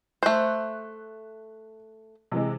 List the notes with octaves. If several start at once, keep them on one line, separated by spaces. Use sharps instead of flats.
A3 C5 F#6
C3 E3 G#3